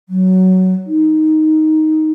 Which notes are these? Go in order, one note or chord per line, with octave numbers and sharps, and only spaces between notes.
F#3
D#4